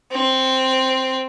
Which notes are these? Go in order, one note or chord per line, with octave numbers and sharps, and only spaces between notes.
C4